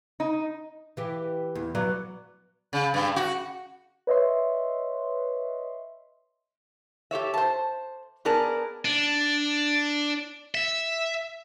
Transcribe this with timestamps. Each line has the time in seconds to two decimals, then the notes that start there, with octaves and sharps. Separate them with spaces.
0.20 D#4
0.97 E3 G4
1.55 E2
1.75 F#3 B3 D5
2.73 C#3
2.94 G2
3.16 F#4
4.07 B4 C#5 D#5 E5 C6
7.11 G4 A4 C#5 E5
7.34 C5 A5
8.25 B3 G#4 A#4 D5 A5
8.85 D4
10.55 E5